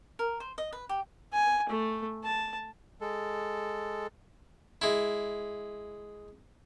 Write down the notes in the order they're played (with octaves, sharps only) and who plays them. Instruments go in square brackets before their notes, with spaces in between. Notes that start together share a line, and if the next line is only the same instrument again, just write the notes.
[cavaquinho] A#4
C5
D#5
B4
G4
[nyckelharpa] G#5
A3
A5
[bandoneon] G#3 A4
[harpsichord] G#3 E4